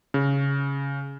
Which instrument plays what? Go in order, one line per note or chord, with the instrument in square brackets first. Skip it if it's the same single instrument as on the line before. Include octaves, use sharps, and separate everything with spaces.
[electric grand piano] C#3